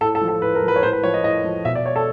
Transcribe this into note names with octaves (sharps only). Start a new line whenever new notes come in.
A2 A4
A4
F3
A4
A2 B4
A#4
F3
B4
C#5
A2 C5
B4
F3 C#5
D#5
A2 D#5
F3
B2 E5
D5
C#5
A4